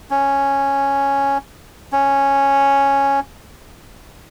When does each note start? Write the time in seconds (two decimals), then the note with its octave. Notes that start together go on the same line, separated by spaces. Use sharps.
0.10 C#4
1.92 C#4